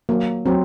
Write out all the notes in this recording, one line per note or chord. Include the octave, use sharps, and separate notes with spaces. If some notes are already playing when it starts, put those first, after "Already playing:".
F#3 A#3
F#3 C4